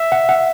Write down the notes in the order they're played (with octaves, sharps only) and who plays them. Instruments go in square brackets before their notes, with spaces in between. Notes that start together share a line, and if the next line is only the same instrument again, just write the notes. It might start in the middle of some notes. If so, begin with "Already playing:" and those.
Already playing: [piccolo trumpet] E5
[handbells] F#5
F#5